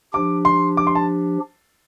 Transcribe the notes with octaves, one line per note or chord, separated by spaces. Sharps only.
F3 D4 G4 D6
C6
D6
C6
A5